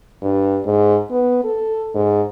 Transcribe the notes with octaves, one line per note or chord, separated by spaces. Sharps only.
G2
G#2
B3
A4
G#2